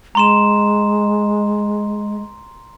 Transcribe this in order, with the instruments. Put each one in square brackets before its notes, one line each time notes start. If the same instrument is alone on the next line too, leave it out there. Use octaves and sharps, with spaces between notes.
[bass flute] G#3 [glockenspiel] A#5 C6 E7